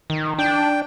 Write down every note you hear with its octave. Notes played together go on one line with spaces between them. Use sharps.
D#3
D4 G5